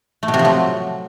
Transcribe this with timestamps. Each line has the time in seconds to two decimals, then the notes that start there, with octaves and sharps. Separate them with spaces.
0.23 A3
0.28 B2
0.34 C3
0.39 F3
0.45 F#3